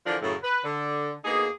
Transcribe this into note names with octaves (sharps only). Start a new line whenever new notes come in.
D3 E3 F3 D4 F4 A#4
F#2 A2 C#3
B4
D3
D2 A#3 B3 D#4 G#4